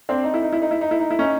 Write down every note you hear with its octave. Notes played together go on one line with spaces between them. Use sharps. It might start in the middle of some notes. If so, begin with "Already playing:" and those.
C4 D4
D#4
E4
D#4
E4
D#4
E4
D#4
E4
D#4
E4
C#4 D#4